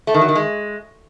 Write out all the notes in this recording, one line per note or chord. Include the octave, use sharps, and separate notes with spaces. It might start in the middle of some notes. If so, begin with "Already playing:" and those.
A3
D#3
F#3
D#3
G#3